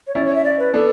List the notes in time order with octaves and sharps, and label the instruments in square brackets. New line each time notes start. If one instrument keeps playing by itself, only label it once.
[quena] C#5
[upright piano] C#4 E4 [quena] D5
[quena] C#5
E5
D5
B4
[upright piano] B3 D4 [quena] A4